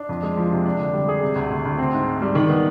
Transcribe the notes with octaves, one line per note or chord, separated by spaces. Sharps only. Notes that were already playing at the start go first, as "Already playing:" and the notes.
Already playing: D4
F2
G#3
F3
C3
D4
D3
G3
G#4
C3
D2
D2
D2
C4
G#2
G#2
G3
D#3
B3